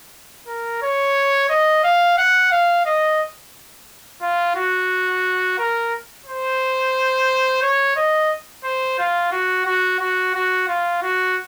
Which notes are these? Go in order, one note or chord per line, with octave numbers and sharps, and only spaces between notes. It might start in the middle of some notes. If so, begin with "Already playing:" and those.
A#4
C#5
D#5
F5
F#5
F5
D#5
F4
F#4
A#4
C5
C#5
D#5
C5
F4
F#4
F#4
F#4
F#4
F4
F#4